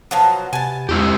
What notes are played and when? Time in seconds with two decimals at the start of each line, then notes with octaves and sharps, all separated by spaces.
0.11 B2 F3 F#3 A5
0.53 C3 B3 G#5 A5
0.89 E2 G#3 E4 G4